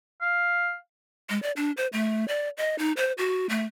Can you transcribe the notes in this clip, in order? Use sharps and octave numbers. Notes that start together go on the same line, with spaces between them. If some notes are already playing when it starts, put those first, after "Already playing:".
F5
G#3
D5
D4
C5
A3
D5
D#5
D#4
C5
F#4
A3